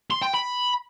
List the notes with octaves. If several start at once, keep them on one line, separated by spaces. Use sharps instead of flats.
C6
G5
B5